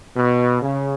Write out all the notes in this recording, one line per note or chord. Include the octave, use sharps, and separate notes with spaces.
B2
C#3